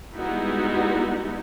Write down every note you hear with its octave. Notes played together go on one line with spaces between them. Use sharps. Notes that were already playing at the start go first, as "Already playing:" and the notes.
G3 G#3 B3 D#4 E4 F#4